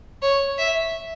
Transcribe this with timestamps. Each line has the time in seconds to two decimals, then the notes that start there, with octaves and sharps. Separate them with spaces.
0.22 C#5
0.58 E5